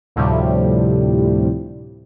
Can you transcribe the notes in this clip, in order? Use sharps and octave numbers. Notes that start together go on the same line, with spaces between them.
D2 A2 C3 F3 G3